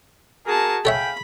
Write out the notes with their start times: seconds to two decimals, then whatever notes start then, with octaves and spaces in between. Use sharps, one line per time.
0.46 F#4 G#4 A#4 G#5 A5
0.85 A4 C#5 E5 F5 G5 G#5 B5